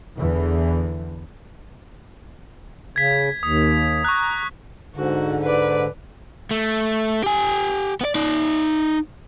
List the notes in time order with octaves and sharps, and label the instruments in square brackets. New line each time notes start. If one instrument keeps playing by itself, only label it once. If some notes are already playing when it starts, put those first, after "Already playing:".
[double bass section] E2 D3 E3
[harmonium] C#3 [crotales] G#6 B6
[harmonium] D#2 [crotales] D#6
[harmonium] A#5 [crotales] C#6 F#6
[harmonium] G#2 D3 [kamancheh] F#4
[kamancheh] B4 D5
[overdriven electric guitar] A3
G4 G#5
B3 D5
D#4 D5